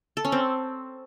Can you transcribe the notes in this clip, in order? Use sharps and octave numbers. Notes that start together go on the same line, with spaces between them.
A4
C#4
C4